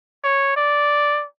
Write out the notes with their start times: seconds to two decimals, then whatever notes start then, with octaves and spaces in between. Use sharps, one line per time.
0.24 C#5
0.56 D5